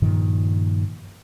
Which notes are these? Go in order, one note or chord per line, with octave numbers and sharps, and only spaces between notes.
G2 A#2 D#3 F3